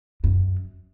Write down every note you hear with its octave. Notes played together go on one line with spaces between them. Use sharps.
F#2